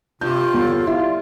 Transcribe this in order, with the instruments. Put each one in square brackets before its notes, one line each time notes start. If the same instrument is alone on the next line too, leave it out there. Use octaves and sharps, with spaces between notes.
[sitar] G2 [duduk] C3 [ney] F4 [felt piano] G6
[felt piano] G1 E2 [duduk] A4
[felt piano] E4 F5 [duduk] F4